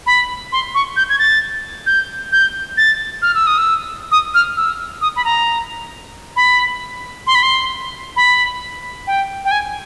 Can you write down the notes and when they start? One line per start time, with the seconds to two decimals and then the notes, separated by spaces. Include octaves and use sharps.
0.06 B5
0.52 C6
0.75 C#6
0.97 G6
1.10 G#6
1.19 A6
1.86 G6
2.32 G6
2.77 A6
3.22 F6
3.35 E6
3.47 D#6
3.58 E6
4.12 D#6
4.35 F6
4.57 E6
5.01 D#6
5.16 B5
5.25 A#5
6.36 B5
7.27 C6
7.35 B5
7.43 C6
8.16 B5
9.07 G5
9.45 G5
9.51 G#5